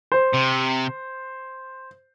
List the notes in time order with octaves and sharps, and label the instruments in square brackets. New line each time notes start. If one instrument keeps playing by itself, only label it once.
[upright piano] C5
[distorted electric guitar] C3